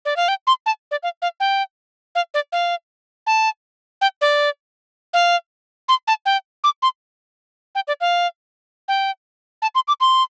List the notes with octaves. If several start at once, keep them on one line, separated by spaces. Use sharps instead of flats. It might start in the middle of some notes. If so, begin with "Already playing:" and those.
D5
F5
G5
C6
A5
D5
F5
F5
G5
F5
D5
F5
A5
G5
D5
F5
C6
A5
G5
D6
C6
G5
D5
F5
G5
A5
C6
D6
C6